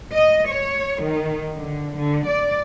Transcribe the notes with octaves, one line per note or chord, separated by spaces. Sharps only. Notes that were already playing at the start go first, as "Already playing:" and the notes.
D#5
C#5
D#3
D3
D3
D5